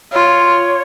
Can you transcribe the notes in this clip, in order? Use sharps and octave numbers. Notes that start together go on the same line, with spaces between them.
F4 C#5